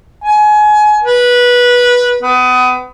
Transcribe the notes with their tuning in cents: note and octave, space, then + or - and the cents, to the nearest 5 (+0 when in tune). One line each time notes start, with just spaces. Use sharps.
G#5 +30
B4 -15
B3 +30